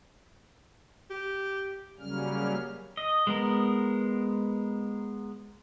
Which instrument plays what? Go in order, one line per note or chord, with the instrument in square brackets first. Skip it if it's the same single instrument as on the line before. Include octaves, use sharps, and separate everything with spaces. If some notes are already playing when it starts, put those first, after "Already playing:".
[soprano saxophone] G4
[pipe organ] C#3 F#3 G3 A#3 C#4 F6
[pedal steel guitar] D#5
G#3 B3 A#4